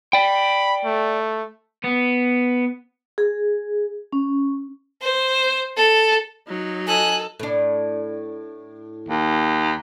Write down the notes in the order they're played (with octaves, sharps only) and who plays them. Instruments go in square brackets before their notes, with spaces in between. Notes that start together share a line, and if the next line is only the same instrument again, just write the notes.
[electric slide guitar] D5 G5 [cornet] B5
[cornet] A3
[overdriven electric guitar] B3
[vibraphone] G#4
C#4
[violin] C5
A4
[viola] F#3 D#4
[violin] A4 [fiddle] D#5 F#6 [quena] G#5
[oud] A2 D4
[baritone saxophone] D#2